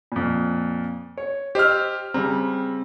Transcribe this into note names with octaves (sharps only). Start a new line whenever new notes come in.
F2 A#2
C#5
G4 C5 D#5 E6 F6
C#3 G3 C4 A#5